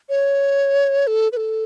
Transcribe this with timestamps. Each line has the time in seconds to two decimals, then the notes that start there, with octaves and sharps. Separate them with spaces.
0.09 C#5
1.07 A4
1.32 B4
1.37 A4